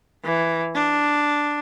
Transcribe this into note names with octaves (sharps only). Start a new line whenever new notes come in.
E3
D4